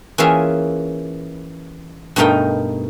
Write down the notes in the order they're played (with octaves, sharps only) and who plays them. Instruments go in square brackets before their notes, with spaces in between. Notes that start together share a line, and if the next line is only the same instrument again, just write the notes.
[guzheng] E3 A#3 C#4 F4 G#4 E5
G2 B2 A3 D#4 A#4 G5